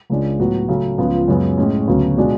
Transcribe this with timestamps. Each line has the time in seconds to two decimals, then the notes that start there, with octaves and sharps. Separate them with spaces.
0.10 C#2 C#3 G#3 D4
0.40 A2 F#3 B3 F#4
0.69 C#3 F#3 A3 C#4
0.98 C#2 C#3 F3 B3 F4
1.28 F#2 C#3 G#3 B3
1.58 A2 G#3 C#4
1.88 D2 C#3 F#3 B3
2.17 B2 G#3 D4 F4 G#4